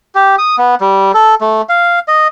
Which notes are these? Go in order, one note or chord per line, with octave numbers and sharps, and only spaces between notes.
G4
D#6
B3
G3
A4
A3
F5
D#5